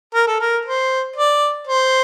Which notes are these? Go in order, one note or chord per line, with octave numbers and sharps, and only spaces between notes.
A#4
A4
A#4
C5
D5
C5